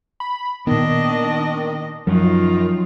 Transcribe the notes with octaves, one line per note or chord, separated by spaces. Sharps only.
B5
A#2 D#3 B3 D4 D#5
F#2 D#3 F3 F#3 F4